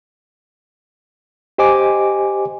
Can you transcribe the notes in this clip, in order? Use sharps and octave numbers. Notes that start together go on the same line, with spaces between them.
G4 C5 D#5 G#5 D6